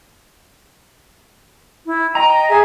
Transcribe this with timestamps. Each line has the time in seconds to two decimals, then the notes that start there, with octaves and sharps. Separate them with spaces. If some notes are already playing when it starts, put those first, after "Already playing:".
1.86 E4
2.15 D#5 G5 A#5
2.49 G#4 E5 G#5